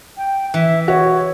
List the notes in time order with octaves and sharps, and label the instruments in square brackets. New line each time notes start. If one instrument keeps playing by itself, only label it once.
[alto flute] G5
[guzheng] E3 [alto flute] E5
[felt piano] F#4 [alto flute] C#5